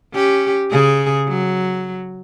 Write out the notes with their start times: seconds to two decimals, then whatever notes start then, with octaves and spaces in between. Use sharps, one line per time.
0.14 C#4 G4
0.70 C#3 G#4
1.28 F#3